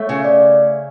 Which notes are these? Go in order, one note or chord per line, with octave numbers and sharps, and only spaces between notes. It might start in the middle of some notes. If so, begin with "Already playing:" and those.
Already playing: A3 C#5
C#3
D5